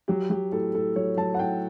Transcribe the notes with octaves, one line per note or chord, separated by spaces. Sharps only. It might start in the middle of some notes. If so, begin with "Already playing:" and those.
F#3 G4
F#3 G4
A2 A4
A2 A4
F#3 C#5
F#3 A5
F#5
A2 G5